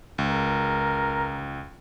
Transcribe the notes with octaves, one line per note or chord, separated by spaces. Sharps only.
C#2
A#4